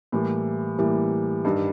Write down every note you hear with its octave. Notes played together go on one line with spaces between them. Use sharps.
A2 E3 G3 A#3
A2 E3 G3 A#3
G2 D#3 G3